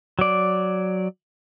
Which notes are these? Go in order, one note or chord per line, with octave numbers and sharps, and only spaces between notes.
F#3 D5